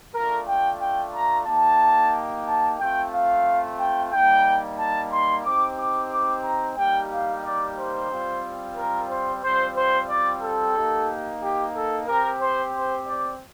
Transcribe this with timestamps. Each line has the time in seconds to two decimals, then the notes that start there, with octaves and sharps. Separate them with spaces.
0.14 A3 D4 F4 A#4
0.47 G5
0.81 G5
1.15 A#5
1.47 A#3 D#4 G4 A5
2.47 A5
2.80 A3 C4 F4 G5
3.13 F5
3.79 G5
4.12 G3 A#3 D#4 G5
4.79 A5
5.13 C6
5.44 C4 D#4 G4 D6
5.79 D6
6.11 D6
6.44 A#5
6.77 G3 A#3 D#4 G4 G5
7.11 F5
7.45 D5
7.77 C5
8.11 G3 C4 F4
8.77 A#4
9.10 C5
9.43 G3 C4 F4 C5
9.77 C5
10.09 D5
10.42 A4
10.75 A#3 D#4 G4
11.42 G4
11.75 A4
12.08 C4 G4 A#4
12.41 C5
12.75 C5
13.07 D5